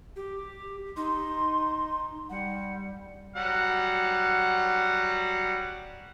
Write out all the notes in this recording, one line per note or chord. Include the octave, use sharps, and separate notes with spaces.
G4
D#4 C6
G3 F#5
F#3 G3 F#5